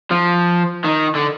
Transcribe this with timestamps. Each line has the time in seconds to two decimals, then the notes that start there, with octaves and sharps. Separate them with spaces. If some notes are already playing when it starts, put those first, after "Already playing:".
0.11 F3
0.85 D#3
1.15 D3